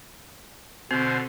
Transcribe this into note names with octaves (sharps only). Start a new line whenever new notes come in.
B2 D3 C4 C5